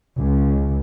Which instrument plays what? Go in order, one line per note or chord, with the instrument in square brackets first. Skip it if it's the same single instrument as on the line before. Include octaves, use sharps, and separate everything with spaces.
[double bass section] C#2